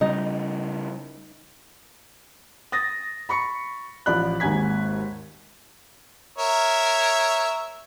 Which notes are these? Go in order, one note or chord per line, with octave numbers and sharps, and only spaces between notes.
C#3 G3 D#4
D#6 A6 A#6
B5 C#6 C#7
A1 F3 D5 B5 F#6
G#1 D#2 G#2 G#5 G#6 B6
A#4 C#5 E5